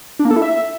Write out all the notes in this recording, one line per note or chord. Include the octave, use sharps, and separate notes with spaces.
D4
A#3
A4
E4
E5